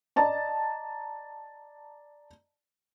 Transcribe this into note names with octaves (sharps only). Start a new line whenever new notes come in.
D5 D#5 A5 A#5